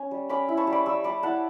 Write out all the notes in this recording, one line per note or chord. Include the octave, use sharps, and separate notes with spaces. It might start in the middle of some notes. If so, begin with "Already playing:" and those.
Already playing: C#4
G3
C#4 B5 D6
E4
A5 C#6
G3
B5 D6
G3 C#6 E6
G3 B5 D6
E4 F#5 A5